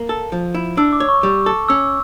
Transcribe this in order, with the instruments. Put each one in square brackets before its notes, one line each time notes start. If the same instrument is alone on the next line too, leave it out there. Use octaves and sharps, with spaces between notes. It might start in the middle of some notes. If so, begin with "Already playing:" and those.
Already playing: [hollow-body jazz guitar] A#3
A4
F3
E4
[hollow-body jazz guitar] D4 [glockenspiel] E6
[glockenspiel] D6
[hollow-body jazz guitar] C#5
[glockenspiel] C#6
[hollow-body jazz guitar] G3
A4
[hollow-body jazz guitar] C#4 [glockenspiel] E6